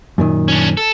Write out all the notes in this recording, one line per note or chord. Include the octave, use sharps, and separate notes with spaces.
F#2 A#2 D#3
C#4 D4
A4